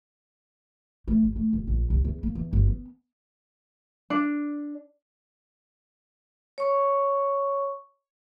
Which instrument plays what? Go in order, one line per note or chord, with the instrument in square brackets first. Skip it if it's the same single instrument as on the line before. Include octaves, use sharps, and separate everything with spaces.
[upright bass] A3
G1
A3
D#1
A#1
C2
E2
A#3
E2
G1
B3
[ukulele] D4
[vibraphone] C#5 C#6